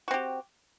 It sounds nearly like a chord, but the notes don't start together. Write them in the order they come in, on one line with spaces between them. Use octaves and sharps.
F#4 C4 G4